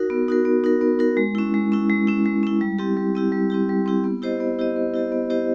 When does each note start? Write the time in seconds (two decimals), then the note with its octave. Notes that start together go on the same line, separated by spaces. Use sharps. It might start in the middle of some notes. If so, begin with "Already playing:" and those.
Already playing: D#4 F#4 A#4
0.10 B3
0.28 D#4 F#4 A#4
0.45 B3
0.64 D#4 F#4 A#4
0.81 B3
0.99 D#4 F#4 A#4
1.17 G#3
1.35 C#4 E4
1.54 G#3
1.72 C#4 E4
1.90 G#3
2.07 C#4 E4
2.26 G#3
2.43 C#4 E4
2.61 G3
2.79 C4 E4 G4
2.97 G3
3.15 C4 E4 G4
3.32 G3
3.50 C4 E4 G4
3.69 G3
3.86 C4 E4 G4
4.04 B3
4.22 E4 G4 C5 D#5
4.40 B3
4.59 E4 G4 C5 D#5
4.76 B3
4.94 E4 G4 C5 D#5
5.12 B3
5.30 E4 G4 C5 D#5